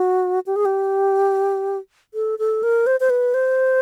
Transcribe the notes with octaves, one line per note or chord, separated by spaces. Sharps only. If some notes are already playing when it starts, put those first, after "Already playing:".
Already playing: F#4
G4
G#4
G4
A4
A4
A#4
C5
C5
B4
C5